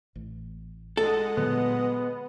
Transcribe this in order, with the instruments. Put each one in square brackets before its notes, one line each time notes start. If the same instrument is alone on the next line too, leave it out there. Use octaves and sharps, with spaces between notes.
[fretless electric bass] A1
[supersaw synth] G#3 D#5 F#5 [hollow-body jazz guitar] A4
[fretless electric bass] A#2 D3 F#3 [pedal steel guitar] B3